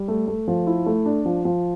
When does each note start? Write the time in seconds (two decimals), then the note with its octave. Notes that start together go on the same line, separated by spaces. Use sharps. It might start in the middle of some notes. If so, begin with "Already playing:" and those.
Already playing: G3
0.08 A3
0.28 A3
0.48 F3
0.67 E4
0.86 A3
1.06 D4
1.26 F3
1.45 F3